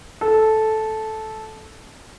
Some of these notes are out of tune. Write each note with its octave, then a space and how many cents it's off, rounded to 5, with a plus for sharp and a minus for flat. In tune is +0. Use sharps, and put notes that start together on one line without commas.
A4 -10